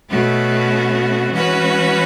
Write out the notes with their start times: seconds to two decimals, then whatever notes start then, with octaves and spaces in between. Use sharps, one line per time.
0.10 B2 A3 C#4 F#4
1.31 E3 G#3 C#4 F#4 B4